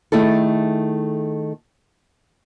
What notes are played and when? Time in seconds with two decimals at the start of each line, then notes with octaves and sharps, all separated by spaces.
0.12 D#3 A3 E4 G#4 A4